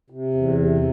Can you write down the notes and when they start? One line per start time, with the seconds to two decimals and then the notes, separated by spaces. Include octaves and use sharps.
0.10 C3
0.34 E2
0.58 C3